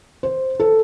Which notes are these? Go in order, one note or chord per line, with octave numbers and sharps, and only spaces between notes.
C5
A4